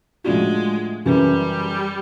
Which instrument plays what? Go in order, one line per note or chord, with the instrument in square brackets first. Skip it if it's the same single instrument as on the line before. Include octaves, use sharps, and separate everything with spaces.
[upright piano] A2 F3 A3 D4 F#4 [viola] G#3
[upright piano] F#2 C#3 E3 [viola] G3